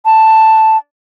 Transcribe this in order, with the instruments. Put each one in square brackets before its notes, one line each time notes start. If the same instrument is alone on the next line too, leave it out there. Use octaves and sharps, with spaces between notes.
[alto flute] A5